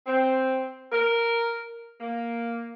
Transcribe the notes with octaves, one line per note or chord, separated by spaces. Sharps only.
C4
A#4
A#3